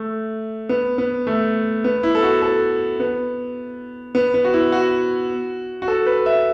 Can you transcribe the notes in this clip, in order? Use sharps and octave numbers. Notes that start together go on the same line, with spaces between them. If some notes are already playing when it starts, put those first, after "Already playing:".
Already playing: A3
B3
B3
A3
B3
E4
A4
F#4
A4
B3
B3
B3
F#4
E4
F#4
F#4
A4
B4
E5